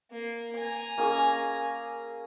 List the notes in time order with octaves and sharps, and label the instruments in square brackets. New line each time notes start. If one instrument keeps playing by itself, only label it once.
[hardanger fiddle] A#3
G#5 A#5
[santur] A#3 C#4 G#4